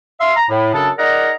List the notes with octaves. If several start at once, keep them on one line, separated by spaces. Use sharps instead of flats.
E5 F5 C6
A#5
A2
F#2 C#3 D4 A4 A5
D#4 G#4 A#4 D5 F#5 A#5